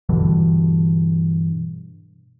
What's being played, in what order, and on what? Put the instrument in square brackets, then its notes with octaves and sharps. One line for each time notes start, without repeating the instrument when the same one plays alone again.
[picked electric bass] G2 B2 D3 E3